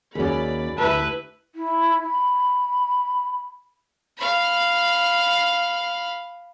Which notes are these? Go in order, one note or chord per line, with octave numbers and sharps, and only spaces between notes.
D#2 C#4 F#4 G#4 D5 B5
D2 E4 G4 B4 E5 A5
E4
B5
F5 B5